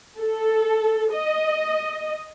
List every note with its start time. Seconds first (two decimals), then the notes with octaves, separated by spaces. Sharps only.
0.19 A4
1.13 D#5